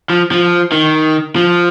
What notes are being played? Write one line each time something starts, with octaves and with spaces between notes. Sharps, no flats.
F3
F3
D#3
F3